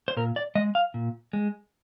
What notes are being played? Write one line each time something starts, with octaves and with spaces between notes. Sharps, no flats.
C5
A#2 A#4
D5
G#3 D#5
F5
A#2
G#3